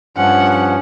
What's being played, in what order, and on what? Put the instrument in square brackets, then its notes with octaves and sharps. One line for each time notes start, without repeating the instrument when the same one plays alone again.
[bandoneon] G2 F3 C#4 [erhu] F#5